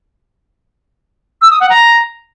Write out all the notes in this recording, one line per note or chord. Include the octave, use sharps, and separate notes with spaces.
E6
D#6
F#5
A#5